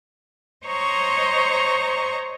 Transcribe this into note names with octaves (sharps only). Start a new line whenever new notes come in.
C5 C#5 D#5 A#5 C#6